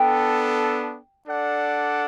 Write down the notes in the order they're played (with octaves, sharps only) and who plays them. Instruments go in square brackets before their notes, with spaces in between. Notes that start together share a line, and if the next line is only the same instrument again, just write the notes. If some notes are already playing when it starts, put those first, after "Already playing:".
Already playing: [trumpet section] B3 D4 A4 [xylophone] G5
[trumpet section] D4 A4 D5 F#5